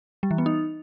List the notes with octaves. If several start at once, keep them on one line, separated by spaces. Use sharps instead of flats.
G3
E3
B3
D#4